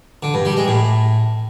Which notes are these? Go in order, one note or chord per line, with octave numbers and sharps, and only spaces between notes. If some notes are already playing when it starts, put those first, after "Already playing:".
D3
G2
G3
G#3
A2